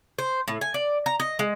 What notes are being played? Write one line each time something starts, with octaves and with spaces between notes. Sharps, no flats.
C5
A2
G#5
D5
A#5
D#5
G#3